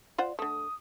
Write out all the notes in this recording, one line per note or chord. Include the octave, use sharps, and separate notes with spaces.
F4 C5 D5 F#5
D3 A3 D#6